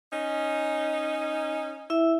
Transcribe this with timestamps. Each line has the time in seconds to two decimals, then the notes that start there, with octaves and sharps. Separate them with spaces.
0.11 C#4 D#4
1.90 E4 E5